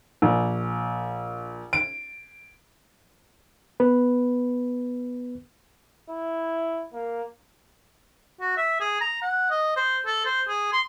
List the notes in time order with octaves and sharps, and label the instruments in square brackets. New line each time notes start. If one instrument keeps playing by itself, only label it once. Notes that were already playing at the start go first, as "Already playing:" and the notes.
[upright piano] A#1
D7
[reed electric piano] B3 B4
[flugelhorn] E4
A#3
[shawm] F#4
E5
G#4
A#5
F#5
D#5
C5
A4
C5
G#4
C6